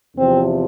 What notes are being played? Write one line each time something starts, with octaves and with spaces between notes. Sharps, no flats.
E2 C3 F3 C4